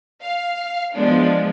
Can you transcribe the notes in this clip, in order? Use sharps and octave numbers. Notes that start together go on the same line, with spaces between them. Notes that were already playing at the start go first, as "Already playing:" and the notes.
F5
F3 G#3 B3 D4